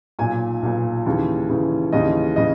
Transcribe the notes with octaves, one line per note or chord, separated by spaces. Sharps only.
B1 A#2 G#5
B1 A#2
D#2 C#3 E3
D#2 C#3 E3
D#2 C#3 E3 D#5
C#3 D#5